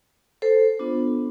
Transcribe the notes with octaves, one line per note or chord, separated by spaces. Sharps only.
A4 C5
B3 D4 F4